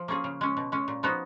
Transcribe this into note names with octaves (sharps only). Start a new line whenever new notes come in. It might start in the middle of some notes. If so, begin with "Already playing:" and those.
Already playing: F3
A#3 C#4 F4 G#4
C#3
G#3 C#4
B2
G#3 C#4
A#2
F3 B3 D#4 F#4